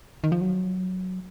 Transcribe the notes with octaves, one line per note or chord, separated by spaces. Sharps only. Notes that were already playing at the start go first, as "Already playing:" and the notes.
D#3
F3
F#3